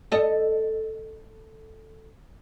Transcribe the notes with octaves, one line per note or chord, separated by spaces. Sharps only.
A4 D#5